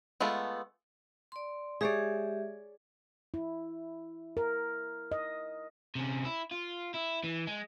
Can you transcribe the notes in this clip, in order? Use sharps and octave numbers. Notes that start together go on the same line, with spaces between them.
G#3 A3 B3 F4 A4
D5 C6
G#3 G4 G#4 C#5 D5 E5
E4
A#4
D#5
C3 C#4
E4
F4
E4
E3
G#3